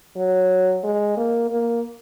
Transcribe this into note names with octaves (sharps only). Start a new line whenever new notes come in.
F#3
G#3
A#3
A#3